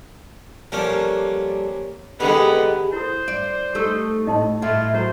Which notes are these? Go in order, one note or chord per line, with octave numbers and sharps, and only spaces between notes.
F3 G3 A3 A#3 C#4 D4
D3 D#3 G#3 B3 G4 G#4
E4 A4 C5
D5
A3 D#4 G4 E6
A2 D#5 A5 C6
A2 E4 F4
F#3 C5